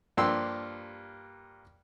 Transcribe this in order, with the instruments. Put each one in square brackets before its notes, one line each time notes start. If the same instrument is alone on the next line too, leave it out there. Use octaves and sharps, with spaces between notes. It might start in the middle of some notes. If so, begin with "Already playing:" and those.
[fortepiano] G2 F3 A#3 G4 C6 E6